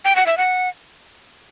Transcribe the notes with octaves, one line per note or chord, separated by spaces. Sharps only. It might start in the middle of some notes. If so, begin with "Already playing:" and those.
G5
F#5
E5
F#5